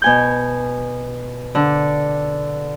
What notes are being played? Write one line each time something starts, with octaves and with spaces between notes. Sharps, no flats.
B2 G#5 G6
D3